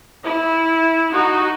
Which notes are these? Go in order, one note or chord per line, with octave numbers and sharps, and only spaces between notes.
E4
D#4 F#4